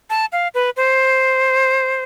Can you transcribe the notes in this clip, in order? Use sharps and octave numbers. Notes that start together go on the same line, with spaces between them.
A5
F5
B4
C5